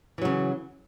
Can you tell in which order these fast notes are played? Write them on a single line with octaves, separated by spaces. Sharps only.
E3 F#3 C#3